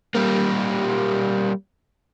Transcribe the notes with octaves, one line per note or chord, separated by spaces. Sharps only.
G3 A#3